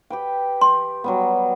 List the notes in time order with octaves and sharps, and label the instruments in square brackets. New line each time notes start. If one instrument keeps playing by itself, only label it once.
[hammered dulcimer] G4 B4 G5
[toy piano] C6
[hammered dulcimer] F#3 G3 B3